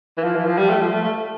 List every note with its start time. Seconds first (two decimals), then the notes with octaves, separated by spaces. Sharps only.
0.17 E3
0.23 F3
0.35 E3
0.46 F3
0.58 G3
0.69 A3
0.81 F3
0.92 A3
1.04 A3